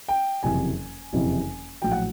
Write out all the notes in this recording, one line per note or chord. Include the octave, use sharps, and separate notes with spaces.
G5
F#1 F2 C3 E3 G#5
F#1 F2 C3 E3
A#1 A2 F#3 G5
F#5